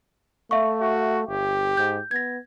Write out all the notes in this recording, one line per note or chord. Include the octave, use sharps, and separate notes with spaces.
A3 E5 F5 C#6
F#4
G1 G4
G#2 G6
B3 G#6 A#6